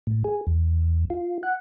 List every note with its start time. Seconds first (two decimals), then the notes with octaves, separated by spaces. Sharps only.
0.07 A2
0.24 G#4
0.47 E2
1.10 F4
1.43 F#5